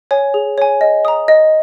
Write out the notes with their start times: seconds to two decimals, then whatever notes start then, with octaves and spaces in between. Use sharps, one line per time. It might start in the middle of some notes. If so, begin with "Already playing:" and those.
0.11 C#5 G#5
0.34 G#4
0.58 C#5 G#5
0.81 D#5
1.05 A#5 D#6
1.28 D#5